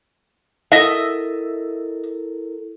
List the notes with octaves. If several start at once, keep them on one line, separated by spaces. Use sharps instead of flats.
E4 A4 A#4 D#5 E5